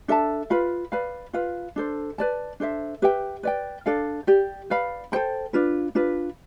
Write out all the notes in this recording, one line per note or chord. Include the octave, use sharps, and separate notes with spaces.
D4 A4 E5 A5
F4 B4 F5 B5
B4 D5 F5 B5
F4 B4 F5
D4 A4 C5
B4 D5 A5
D4 A4 C5 E5
G4 B4 E5 G5
B4 D5 G5
D4 A4 D5 F5
G4 D5 G5
B4 D5 F5 B5
A4 C5 G5 B5
D4 F4 B4
D4 F4 B4